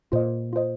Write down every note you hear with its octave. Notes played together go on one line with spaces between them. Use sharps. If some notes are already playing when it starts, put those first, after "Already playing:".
A#2 F4 C5 D#5
F4 C5 D#5